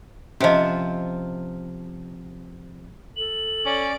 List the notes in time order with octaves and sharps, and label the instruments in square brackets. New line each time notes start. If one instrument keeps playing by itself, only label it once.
[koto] C3 F3 [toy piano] C#4 C5 D#5
[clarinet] A4 [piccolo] F#7
[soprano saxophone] C#4 [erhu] D5